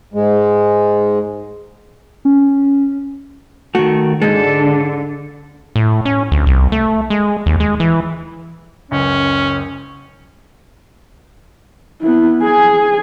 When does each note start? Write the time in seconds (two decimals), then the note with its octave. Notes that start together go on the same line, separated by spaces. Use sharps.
0.14 G#2 G#3
2.25 C#4
3.75 D#3 A3 F#4
4.22 G#2 D3 G#3 A4
5.76 A2
6.05 C#4
6.32 D2
6.46 C2
6.72 A3
7.10 G#3
7.46 D#2
7.60 G#3
7.80 E3
8.91 F#1 C#2 C#4
12.02 B3 E4
12.43 G#4 G#5